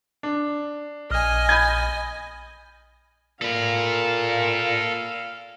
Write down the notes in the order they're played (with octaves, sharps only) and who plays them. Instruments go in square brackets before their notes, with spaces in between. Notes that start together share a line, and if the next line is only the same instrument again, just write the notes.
[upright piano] D4
[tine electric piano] A#1 F6 [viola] D#5 G#5
[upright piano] B5 G6 G#6
[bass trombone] A#2 [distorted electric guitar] A4 B5 [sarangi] F5